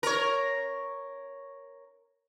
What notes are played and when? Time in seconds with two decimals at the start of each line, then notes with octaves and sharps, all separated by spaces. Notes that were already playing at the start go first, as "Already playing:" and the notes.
0.03 A#4 C#5